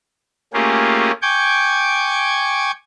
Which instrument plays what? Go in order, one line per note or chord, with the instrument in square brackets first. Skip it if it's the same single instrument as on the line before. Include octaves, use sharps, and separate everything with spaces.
[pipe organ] A3 A#3 C#4 F4 G4 G#4
G5 G#5 C#6 D6 G6 G#6